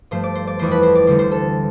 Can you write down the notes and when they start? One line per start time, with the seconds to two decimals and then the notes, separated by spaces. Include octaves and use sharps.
0.11 G2 F3 A3 C5
0.23 D5
0.35 C5
0.47 D5
0.59 F2 E3 A3 C5
0.71 B4
0.83 C5
0.95 D5
1.07 D2 D3 G3 C5
1.19 C5
1.32 A4